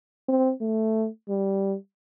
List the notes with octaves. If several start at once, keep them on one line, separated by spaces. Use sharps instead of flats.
C4
A3
G3